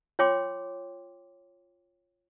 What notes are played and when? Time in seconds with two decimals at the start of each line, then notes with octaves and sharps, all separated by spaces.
0.19 F4 C#5 G5 C6 D6